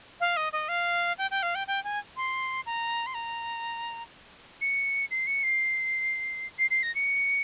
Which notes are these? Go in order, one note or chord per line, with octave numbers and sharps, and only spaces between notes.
F5
D#5
D#5
F5
G5
G5
F5
G5
G5
G#5
C6
A#5
C6
A#5
C#7
C7
C#7
C7
C7
C7
A#6
C#7